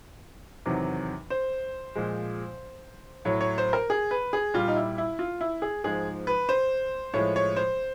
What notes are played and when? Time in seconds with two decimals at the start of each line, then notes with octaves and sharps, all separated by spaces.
0.66 E2 C3 D#3 F#3
1.30 C5
1.95 A#2 F3 G#3
3.25 A2 F#3 C#5
3.41 C#5
3.58 C5
3.73 A#4
3.90 G#4
4.11 B4
4.33 G#4
4.54 A#2 G3 F4
4.68 D#4
4.76 E4
4.98 E4
5.19 F4
5.41 E4
5.62 G#4
5.84 G#2 F3 G#3 G#4
6.27 B4
6.49 C5
7.14 A2 F3 G#3 C#5
7.36 C#5
7.56 C5